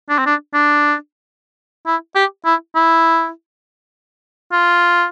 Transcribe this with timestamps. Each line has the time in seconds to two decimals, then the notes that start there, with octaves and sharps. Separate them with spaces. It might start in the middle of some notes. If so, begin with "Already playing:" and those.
0.09 D4
0.18 C4
0.26 D4
0.54 D4
1.87 E4
2.15 G4
2.46 E4
2.76 E4
4.52 F4